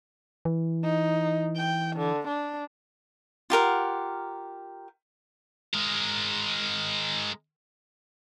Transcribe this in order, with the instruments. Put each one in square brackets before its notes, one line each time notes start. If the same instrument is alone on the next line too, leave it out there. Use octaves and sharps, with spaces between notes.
[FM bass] E3
[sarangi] D#4
G5
D3
D4
[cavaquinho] F4 G4 A#4 F#5
[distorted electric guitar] G#3 A#4